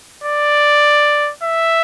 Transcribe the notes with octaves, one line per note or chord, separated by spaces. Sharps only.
D5
E5